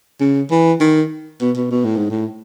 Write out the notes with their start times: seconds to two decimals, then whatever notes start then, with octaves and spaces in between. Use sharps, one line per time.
0.20 C#3
0.51 E3
0.80 D#3
1.41 B2
1.57 B2
1.71 B2
1.85 A2
1.97 G#2
2.10 A2